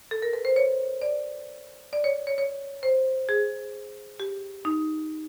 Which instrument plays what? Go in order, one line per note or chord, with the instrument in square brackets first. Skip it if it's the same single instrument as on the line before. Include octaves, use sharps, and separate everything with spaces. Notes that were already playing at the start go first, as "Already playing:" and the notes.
[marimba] A4
A#4
B4
C5
C#5
D5
D5
C#5
C#5
C#5
C5
G#4
G4
D#4